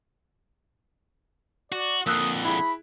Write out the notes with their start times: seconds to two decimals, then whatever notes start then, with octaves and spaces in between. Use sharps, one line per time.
1.72 F#4 D5
2.06 F2 D3 A#3 D#6 E6 F#6
2.45 E4 G#4 B5